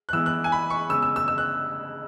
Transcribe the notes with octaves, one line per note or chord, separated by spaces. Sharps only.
F#6
E3 G#3 B3 E6
F#6
G#5
B5
C#6
C#3 G#3 B3 E6
E6
E6
E6
F#6